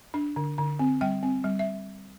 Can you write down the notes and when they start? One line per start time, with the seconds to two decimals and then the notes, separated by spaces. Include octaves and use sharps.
0.14 D4
0.36 D3
0.58 D3
0.79 C4
1.01 G3 G5
1.23 C4
1.44 G3
1.59 E5